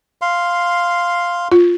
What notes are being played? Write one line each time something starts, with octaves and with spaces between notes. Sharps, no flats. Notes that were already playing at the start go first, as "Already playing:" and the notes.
F5 C6
F4